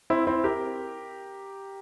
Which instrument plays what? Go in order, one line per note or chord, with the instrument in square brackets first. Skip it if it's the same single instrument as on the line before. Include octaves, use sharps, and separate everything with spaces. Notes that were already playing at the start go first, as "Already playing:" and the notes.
[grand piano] C4 E4
C4 E4
G4 A#4